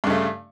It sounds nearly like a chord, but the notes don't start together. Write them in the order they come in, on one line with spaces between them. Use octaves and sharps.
G2 C#3 A3